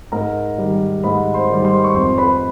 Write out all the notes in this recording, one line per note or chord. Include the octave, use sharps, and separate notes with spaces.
G#2 A#4 A#5
D#3 G3
G#2 B4 B5
C5 C6
D#3 G3
C5 C6
C#6
F2 C5 C6
B4 B5